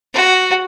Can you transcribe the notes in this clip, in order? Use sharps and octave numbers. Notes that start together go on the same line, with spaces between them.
F#4